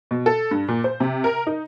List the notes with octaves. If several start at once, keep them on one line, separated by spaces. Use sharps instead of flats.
B2
A4
G2
A#2
C5
C3
A#4
D#4